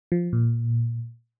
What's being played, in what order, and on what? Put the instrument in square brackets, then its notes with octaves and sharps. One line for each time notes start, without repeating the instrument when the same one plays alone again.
[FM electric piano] F3
A#2